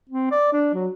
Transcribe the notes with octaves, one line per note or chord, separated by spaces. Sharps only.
C4
D5
D4
F#3